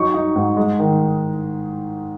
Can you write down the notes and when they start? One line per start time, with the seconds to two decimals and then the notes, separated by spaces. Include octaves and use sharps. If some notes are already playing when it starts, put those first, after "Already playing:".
Already playing: F#3 D#4 C#6
0.14 D#4
0.36 G#2
0.57 G#3
0.79 D#3